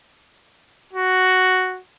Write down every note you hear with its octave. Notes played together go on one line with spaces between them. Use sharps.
F#4